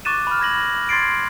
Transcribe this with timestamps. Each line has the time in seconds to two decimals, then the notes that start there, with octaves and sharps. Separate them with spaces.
0.05 C#6 D6 F#6 A6 D#7 E7
0.27 B5 F6
0.40 B5 G#6 A#6 F#7
0.89 C6 G#6 A6 C7 D7